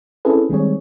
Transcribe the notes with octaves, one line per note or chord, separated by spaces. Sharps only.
C4 C#4 E4 G#4 A4 B4
D#3 G3 G#3 C4 G#4 C#5